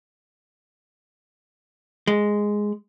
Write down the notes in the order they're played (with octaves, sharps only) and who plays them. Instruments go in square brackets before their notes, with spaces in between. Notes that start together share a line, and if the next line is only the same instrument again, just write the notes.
[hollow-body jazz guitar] G#3